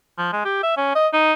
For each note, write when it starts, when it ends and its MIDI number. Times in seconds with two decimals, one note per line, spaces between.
0.18 0.29 53
0.33 0.40 56
0.45 0.61 67
0.63 0.76 76
0.77 0.94 61
0.95 1.08 75
1.13 1.33 63